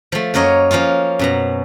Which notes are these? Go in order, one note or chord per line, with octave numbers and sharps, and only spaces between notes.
F3 A3
F#2 A#3 A#4 C#5 D#5
F3 A#3 C#4 F4
F#2 B2 A#5